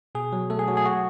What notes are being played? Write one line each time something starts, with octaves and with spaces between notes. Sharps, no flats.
B2 G#4
F#3
A3 A4
G#4
F#3 F#4
G#4
F#4